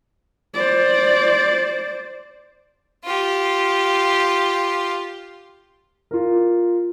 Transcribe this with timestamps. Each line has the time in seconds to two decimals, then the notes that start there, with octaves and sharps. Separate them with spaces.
0.54 C5 D5
3.04 F4 G4
6.11 F4 A#4